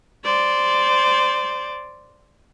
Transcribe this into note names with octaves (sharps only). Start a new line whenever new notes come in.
C5 D5